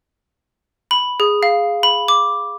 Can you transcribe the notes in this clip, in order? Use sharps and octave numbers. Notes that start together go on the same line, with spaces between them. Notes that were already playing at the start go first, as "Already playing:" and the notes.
B5
G#4
F5
B5
D6